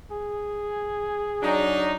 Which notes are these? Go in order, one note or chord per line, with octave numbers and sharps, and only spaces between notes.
G#4
F#3 D4 D#4